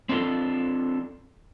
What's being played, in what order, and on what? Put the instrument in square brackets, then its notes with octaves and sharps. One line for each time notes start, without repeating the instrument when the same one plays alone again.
[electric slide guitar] C4 D4 F4 A4